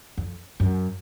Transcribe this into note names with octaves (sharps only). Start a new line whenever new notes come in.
F2
F#2